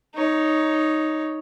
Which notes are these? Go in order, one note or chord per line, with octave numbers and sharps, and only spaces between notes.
D#4 C#5